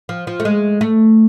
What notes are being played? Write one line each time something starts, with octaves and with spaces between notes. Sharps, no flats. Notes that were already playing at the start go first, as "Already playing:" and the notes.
F3
F3
A3
G#3
A3